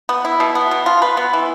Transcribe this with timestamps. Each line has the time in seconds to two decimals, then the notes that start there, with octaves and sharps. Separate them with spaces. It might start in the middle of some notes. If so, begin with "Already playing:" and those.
0.09 B3
0.25 E4
0.40 B2
0.55 B3
0.71 B2
0.86 F4
1.02 B4
1.17 B3
1.33 E3